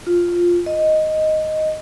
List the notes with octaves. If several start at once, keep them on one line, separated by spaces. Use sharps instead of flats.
F4
D#5